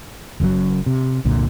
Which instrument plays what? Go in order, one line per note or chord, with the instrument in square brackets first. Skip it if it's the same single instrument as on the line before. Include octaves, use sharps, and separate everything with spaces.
[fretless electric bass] F#1 F#2 C#3 F#3
C3
F1 C2 A#2 D3